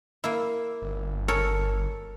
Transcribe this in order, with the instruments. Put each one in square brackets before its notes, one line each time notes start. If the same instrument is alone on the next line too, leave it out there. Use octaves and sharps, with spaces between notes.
[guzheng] A#3 E4
[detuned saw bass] G1
[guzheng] A4 A#4 C#5